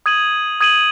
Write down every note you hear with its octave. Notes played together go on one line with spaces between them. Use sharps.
D#6 G#6 D#7 F#7
D#6 G#6 D#7 F#7